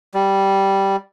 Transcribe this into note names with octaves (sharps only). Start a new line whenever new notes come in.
G3